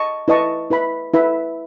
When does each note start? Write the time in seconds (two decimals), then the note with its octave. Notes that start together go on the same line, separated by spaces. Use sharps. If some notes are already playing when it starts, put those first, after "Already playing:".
Already playing: D#5 A5 C#6
0.28 E4 B4 D#5 A5 C#6
0.70 E4 B4 E5 B5
1.14 E4 B4 E5 B5